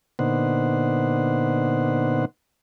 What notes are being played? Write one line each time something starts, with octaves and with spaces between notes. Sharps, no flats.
A#2 D3 B3 D#4 C5 F#5